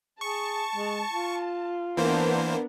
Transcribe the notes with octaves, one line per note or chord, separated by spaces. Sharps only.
G#4 A5 C#6
G#3
F4
E3 A#3 B3 D4 A#4 C5